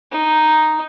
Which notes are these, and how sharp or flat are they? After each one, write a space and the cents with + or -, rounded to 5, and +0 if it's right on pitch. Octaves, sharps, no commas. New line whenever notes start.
D#4 +0